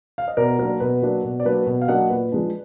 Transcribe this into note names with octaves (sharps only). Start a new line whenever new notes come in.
F5
D#5
B2 A#4 D5
F#3 A#3 D4 A#4
B2 B4
F#3 A#3 D4
B2
D5
F#3 A#3 D4 B4
B2
F5
F#3 A#3 D4 D#5 F#5
A#2 B4
F3 G#3 D4